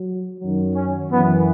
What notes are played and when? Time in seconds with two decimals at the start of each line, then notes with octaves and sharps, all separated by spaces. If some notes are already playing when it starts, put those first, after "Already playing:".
Already playing: F#3
0.40 F#2 D#3 F#3
0.75 C#4
1.11 F#2 E3 B3